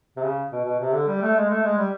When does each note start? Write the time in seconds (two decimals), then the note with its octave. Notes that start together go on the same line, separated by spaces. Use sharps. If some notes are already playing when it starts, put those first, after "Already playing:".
0.16 C3
0.23 C#3
0.52 B2
0.65 B2
0.80 C3
0.93 D3
1.08 G3
1.21 A3
1.36 G#3
1.49 A3
1.63 G#3
1.77 G3